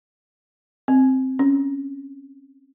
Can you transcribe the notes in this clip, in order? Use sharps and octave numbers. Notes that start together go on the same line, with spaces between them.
C4
C#4